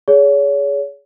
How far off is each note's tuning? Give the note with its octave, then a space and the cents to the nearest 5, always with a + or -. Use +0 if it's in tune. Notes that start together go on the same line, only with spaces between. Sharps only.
G#4 +5 C#5 +35